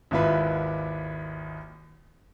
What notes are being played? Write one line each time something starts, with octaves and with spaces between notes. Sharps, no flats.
G#1 D#2 E4 F4 B4